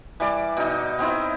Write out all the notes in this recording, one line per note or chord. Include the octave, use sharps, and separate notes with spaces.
E3 G3 D5 D6
B2 D#4
B3 C4 D#4 E4